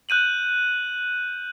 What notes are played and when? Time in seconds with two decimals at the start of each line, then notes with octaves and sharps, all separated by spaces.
0.09 F#6 G6 D#7 F#7